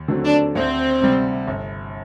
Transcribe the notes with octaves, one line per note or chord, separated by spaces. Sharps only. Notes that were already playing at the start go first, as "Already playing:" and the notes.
Already playing: D#2
D3 F#3 A3 C4
D4
D2 C4
C3 G3
G1